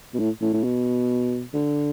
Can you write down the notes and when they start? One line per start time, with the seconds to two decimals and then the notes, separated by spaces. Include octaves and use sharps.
0.14 B2
0.20 A2
0.42 A2
0.53 A2
0.64 B2
1.54 D3